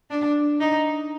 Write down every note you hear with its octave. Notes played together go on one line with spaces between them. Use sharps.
D4
D#4